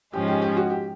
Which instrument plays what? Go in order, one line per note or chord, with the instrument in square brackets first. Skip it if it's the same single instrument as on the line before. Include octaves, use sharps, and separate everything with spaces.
[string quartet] G#2 F3 G#3 C#4 [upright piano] G4
[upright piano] G4
G4
F#4
G4